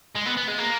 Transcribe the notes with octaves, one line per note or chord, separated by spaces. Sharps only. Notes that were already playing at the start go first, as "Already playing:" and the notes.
G#3
B3
B3
G#3
A#3